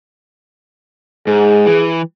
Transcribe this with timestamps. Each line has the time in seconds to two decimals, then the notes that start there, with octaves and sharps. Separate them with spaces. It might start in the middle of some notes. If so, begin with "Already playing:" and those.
1.27 G#2 G#4
1.66 E3